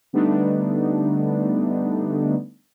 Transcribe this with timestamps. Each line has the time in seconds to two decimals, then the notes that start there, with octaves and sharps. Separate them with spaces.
0.13 D3 G3 A3 B3 D4 D#4